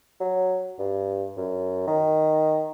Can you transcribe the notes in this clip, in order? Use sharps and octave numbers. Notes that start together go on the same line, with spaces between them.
F#3
G2
F#2
D#3